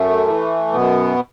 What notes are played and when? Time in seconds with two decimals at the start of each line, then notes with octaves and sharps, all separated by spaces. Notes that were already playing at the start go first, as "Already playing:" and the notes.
Already playing: F#2 A3
0.27 E3
0.73 F#2 B2 B3